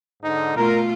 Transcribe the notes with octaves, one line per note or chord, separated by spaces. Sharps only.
G#2 D3 D#4
B2 A3 F4 A#4